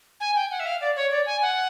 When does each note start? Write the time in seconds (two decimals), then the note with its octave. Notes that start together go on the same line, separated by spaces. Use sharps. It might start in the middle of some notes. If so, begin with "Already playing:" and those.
0.20 G#5
0.35 G5
0.51 F#5
0.60 E5
0.66 F5
0.81 D5
0.96 C#5
1.11 D5
1.26 G#5
1.42 F#5